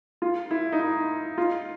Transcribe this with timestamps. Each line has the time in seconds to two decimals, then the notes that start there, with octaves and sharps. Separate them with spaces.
0.22 F4
0.51 E4
0.72 D#4
0.80 E4
1.38 F4